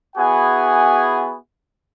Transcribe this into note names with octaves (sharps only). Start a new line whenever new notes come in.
B3 E4 F#4 G#4 F#5 G#5